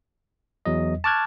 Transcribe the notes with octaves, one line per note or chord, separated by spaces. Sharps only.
E2 F#3 D#5
A5 C#6 D6 F6 F#6 G#6